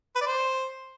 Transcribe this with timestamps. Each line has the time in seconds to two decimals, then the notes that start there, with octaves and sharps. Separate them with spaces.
0.16 B4
0.21 D5
0.26 C5